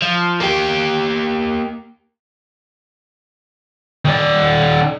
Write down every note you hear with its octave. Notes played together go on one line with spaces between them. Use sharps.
F3
A#3 G4
D#3 D5